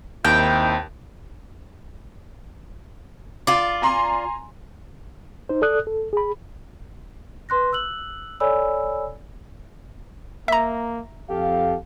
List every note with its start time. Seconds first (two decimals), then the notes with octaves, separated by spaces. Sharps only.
0.25 D#2 D#3 C4 E4 G5 G6
3.47 F4 D5
3.82 G#5 A#5 C6
5.49 D#4 C5
5.62 A4 D5 D#6 F#6
5.87 A4
6.13 G#4 B5
7.49 B4 C6 F#6 A#6
7.73 E6 F#6 F#7
8.40 A4 C#5 D5 G#5 B5 E6
10.48 A#3 E5 A#5
11.30 F2 G4 A4 F5